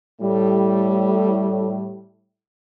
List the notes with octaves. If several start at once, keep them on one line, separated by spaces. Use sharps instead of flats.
A2 G3